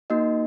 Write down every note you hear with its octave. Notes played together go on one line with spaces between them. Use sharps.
A#3 D#4 F#4 D#5